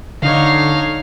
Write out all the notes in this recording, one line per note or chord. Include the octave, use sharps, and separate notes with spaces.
D3 D#4 C#5 F5